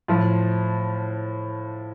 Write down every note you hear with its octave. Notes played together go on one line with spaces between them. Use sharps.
A2 F3 F4